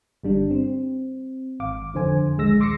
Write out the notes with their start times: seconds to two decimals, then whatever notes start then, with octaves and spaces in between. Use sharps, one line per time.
0.23 G1 G3 D4
0.51 C4
1.60 G#1 F5 D6
1.94 F2 D3 C5 G#5
2.37 A#1 D#2 G#3 E6 A#6
2.60 C6 D6 E6 A#6 C7 C#7